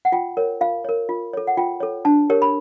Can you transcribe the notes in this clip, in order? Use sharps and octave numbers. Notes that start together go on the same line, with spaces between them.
F#5
F4 G5
A#4 C#5
F4 F5
A#4 C#5
F4
A4 C#5
F#5
F4 G5
A4 C#5
D4 A5
G4 A#4 C#5
B5